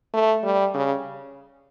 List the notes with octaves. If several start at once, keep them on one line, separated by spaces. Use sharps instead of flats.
A3
G3
C#3